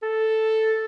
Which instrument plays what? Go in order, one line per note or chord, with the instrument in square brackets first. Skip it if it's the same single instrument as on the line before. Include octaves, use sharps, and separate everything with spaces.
[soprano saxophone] A4